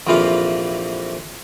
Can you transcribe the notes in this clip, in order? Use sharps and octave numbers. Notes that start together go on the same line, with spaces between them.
A#1 F2 C3 E3 F4 F5